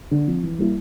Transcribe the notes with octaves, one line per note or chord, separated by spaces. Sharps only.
D3
F3 C4
E3
G3 A#3 E4